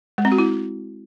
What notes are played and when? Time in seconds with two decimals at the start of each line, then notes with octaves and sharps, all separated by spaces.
0.18 G#3
0.25 C4
0.32 F#4
0.38 E4